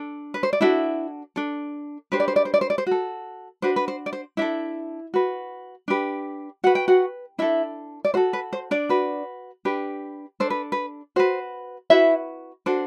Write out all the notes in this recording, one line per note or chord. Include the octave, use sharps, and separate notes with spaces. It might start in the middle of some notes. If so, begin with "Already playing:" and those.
Already playing: D4 A4
B4
C5
D5
D4 E4 F#4 A4 E5
D4 A4
D4 G4 B4 C5
D5
C5
D5
C5
D5
C5
D5
C5
F#4 A4
D4 F#4 B4 C5
B4
C5
D5
C5
D4 E4 A4 E5
F#4 B4
D4 G4 B4
F#4 B4 F#5
G5
F#4 F#5
D4 E4 A4 E5
D5
F#4 A4 C5
B4
C5
D4 D5
F#4 B4
D4 G4 B4
D4 A4 C5
B4
B4
F#4 B4 C5
E4 F#4 B4 E5
D4 F#4 A4 C5